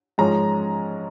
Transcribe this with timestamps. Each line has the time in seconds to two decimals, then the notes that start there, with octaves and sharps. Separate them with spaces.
0.18 G#2 F3 G#3 C#4 A#5